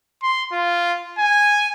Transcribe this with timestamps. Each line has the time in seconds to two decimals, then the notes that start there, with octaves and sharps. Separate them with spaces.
0.23 C6
0.53 F4
1.19 G#5